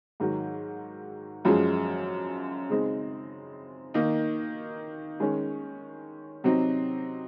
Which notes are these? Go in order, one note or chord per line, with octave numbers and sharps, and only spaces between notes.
G#2 D#3 F#3
F#2 F3 G#3
C#3 G#3 C4 D#4
D#3 A#3 D#4
D#3 G#3 C#4
C3 F#3 C4 D#4